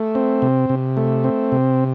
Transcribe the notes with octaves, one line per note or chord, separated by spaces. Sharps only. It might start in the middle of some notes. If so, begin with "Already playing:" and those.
Already playing: A3
C4
C3
C3
A3
C4
C3